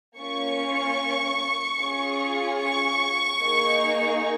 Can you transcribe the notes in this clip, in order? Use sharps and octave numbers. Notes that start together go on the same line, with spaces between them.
A#3 C#4 F4 C#6
C#4 F4 G#4
C#6
A#3 D#4 G#4